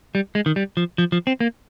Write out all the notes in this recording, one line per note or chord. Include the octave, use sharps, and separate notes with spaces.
G3
G#3
D#3
G3
F3
F3
F3
C4
A#3